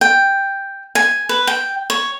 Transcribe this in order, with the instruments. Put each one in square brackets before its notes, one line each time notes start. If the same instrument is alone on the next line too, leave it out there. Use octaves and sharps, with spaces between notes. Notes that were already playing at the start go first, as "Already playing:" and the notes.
[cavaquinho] G5
G#5
B4
G5
C#5